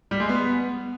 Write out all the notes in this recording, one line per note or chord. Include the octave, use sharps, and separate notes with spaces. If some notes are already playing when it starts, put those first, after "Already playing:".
G3
G#3
B3